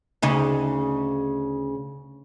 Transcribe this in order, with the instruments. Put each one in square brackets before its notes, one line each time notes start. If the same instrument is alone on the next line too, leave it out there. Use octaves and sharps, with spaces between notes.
[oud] D2 C#3 D#4